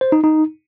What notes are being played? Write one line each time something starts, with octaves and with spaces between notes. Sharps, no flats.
C5
D#4
D#4